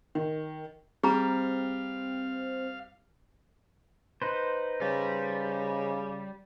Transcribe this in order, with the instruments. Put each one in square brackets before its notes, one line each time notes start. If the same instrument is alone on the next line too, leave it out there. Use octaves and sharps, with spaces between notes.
[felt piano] D#3
[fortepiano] G3 [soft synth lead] C4 [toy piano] G#4 A#5 [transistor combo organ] F5
[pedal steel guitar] D#4 B4 C5
[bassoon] C#3 [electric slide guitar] G3